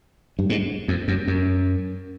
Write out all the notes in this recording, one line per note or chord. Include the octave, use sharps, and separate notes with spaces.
G2
G#2
F2
F#2
F#2